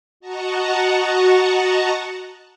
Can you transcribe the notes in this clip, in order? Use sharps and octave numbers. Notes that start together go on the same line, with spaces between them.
F#4 D#5 F#5 A5 A#5 C#6